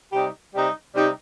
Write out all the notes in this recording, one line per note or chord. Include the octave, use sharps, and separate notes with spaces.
C3 G3 D#4 G4
C3 G3 D#4 G4
C3 G3 D#4 G4